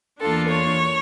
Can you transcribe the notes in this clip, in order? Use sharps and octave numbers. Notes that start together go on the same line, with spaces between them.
E2 E3 A#3 D4 F4 A4
C#5